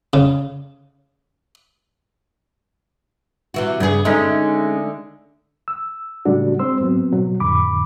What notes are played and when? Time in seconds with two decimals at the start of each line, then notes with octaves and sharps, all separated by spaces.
0.13 C#3
3.54 C3 E3 F#4
3.80 G2 C#3 B3 G#4
4.05 D3 G#3 A3 C#4 D#4
5.68 E6
6.25 A2 C#3 G3 A3 D4 F#4
6.59 G#3 C4 C5 C6 E6
6.80 G#2 F#3 B3 C4
7.12 B2 F#3
7.40 F2 A2 D3 B5 D6